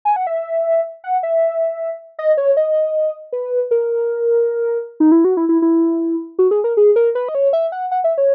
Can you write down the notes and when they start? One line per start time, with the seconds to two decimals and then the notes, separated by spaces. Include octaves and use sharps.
0.05 G#5
0.16 F#5
0.27 E5
1.04 F#5
1.23 E5
2.19 D#5
2.37 C#5
2.57 D#5
3.33 B4
3.71 A#4
5.00 D#4
5.12 E4
5.25 F#4
5.37 E4
5.49 E4
5.62 E4
6.39 F#4
6.51 G#4
6.64 A#4
6.77 G#4
6.96 A#4
7.15 B4
7.29 D#5
7.35 C#5
7.53 E5
7.72 F#5
7.91 F#5
8.04 E5
8.18 C#5